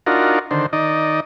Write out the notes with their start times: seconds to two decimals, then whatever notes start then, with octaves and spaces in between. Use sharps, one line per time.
0.06 D4 D#4 F4 F#4 A#4
0.51 D3 D#3 C5
0.73 D#3 D#4 D5 D#5